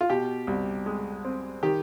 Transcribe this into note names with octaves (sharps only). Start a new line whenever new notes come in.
F4
B2 G4
C2
G#3
C4
D#3 G4